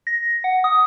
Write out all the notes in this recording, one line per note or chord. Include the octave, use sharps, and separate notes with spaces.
A#6
F#5
D#6